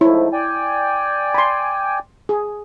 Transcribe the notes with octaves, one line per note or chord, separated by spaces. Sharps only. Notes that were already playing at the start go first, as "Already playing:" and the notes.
G#2 F3 A3 E4 C#5
D5 G5 G#5
B5 C6
G#4